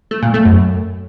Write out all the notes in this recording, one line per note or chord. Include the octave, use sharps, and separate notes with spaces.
A3
A#2
A3
F#2